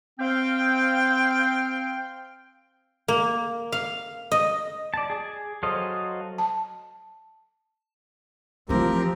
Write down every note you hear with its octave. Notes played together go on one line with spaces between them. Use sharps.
C4 F5 G5
A#3
F5
D#5
D5 A5
G#4
F#3 A4 C5 D#5 F5
A5
E3 F3 A3 C4 G4 A#4